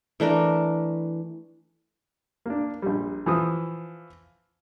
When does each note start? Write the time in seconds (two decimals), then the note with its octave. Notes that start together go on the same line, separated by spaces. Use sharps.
0.20 E3 A3 D4 A#4
2.46 A#3 D4
2.82 A#1 G3
3.26 E3 F3 D#6